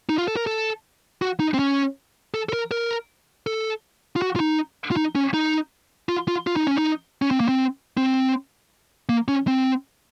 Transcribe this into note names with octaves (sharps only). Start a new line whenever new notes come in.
D#4
F4
A4
A#4
A4
F#4
D#4
C4
C#4
A4
A4
A#4
A#4
A4
F4
F#4
F4
D#4
F4
D#4
C#4
D#4
F4
F4
F4
D#4
C#4
D#4
C#4
C4
A#3
C4
C4
A#3
C#4
C4